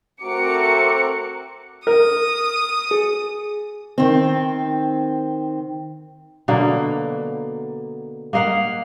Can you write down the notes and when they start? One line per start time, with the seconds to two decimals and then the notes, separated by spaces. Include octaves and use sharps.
0.23 A3 C4 F#4 A#4 D6 C#7
1.87 A#4 D#6
2.91 G#4
3.98 D#3 C4
6.48 B2 D3 F#3 A#3
8.33 A#3 D#5 F5 F#5